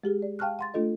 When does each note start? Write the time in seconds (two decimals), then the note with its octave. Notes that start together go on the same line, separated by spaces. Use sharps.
0.04 G#3 G4 G#4
0.22 D5
0.39 F5 G5 A5 C#6 F6 F#6
0.59 F#5 C6 A6
0.74 A3 D4 F4 A4 D#5